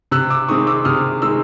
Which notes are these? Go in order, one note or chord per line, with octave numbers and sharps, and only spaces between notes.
C3 E6 F#6
D6 E6
D#3 G#3 C4 C#6 D#6
D6 E6
C3 D#6 F6
D#3 G#3 C4 E6